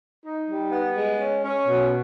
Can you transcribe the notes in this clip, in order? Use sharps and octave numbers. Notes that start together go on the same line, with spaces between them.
D#4
G3
B3
G#3
C#4
C#4
B2